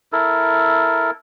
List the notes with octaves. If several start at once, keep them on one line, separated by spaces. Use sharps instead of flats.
E4 A4 A#4